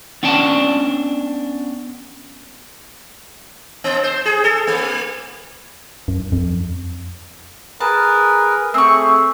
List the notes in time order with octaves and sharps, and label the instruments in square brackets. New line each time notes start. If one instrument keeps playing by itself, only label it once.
[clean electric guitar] B3 C#4 D4 G5 A5
[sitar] B3
C5
G#4
A4
A#3
[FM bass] F#2
F2
[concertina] G#4 A#4 B4 [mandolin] A5
[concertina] A3 G#4 [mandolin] C4 C#6